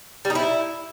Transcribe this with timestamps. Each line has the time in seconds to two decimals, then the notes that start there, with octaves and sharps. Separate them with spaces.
0.25 G3
0.30 D#4
0.35 E4